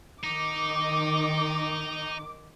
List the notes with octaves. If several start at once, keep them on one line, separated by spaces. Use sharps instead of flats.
D#3 D#4 D6